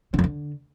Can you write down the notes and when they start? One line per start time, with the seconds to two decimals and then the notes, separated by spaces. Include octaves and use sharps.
0.14 D3
0.19 F2
0.24 D3